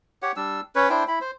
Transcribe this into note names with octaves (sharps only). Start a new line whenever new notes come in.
G4 C#5 F#5
G3 D4 E6
C#4 B4 C#5
D4 E4 C5 G5
E4 B5
C5